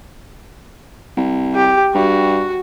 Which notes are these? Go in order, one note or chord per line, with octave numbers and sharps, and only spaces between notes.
C2
G4
G2 F#4